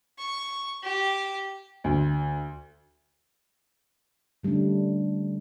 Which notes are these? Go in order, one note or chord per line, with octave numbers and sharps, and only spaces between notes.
C#6
G4
D2
D3 G3 A3 C#4 D4